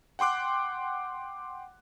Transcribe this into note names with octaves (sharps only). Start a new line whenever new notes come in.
F#5 G5 C6 D6 F#6